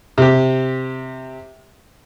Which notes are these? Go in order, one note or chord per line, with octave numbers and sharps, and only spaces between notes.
C3 G4